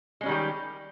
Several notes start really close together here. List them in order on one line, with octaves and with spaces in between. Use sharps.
G#3 C#4 G3 D#3 G4